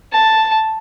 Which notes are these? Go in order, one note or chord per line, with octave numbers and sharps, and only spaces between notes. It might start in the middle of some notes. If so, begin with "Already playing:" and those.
A5